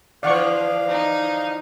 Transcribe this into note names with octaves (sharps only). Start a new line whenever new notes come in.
D3 E3 F3 D5 F5 F#5 C#6
D#4